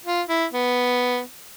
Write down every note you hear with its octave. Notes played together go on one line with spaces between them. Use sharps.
F4
E4
B3